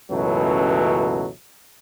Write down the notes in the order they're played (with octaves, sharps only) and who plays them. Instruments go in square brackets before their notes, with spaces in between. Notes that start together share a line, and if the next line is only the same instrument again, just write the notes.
[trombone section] C#2 F#2 B2 E3 F#3 A3